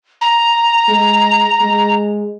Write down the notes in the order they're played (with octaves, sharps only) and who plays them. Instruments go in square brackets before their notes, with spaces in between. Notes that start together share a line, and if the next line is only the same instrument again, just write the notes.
[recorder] A#5
[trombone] G#3
G#3